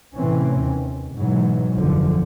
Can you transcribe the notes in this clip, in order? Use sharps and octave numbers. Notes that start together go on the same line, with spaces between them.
A2 C3 E3 C4 C#4
D#2
G#2 B2 E3 F#3
F#1 E2 D3 F3